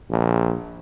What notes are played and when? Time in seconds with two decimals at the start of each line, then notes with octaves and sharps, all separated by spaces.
0.10 A#1